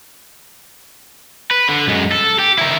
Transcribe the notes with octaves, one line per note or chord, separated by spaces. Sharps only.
B4
D3
F#2 G#3
A4
G4
D#3 E4